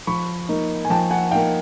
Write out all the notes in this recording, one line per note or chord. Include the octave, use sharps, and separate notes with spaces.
F3 B5 C#6
A#3 D#4
G#5
F3 G5 A5
F#5 G#5
A#3 D#4 F5 G5